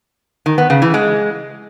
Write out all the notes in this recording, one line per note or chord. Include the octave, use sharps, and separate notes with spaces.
D#3
B3
C#3
E3
G#3